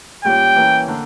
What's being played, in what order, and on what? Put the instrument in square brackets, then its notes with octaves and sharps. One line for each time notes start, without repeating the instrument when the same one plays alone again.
[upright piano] A#2 G3 C#4 G4 [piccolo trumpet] G5
[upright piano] E3 A#3 C#4
D3 A#3 D4